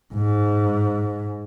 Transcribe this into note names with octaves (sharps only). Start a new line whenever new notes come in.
G#2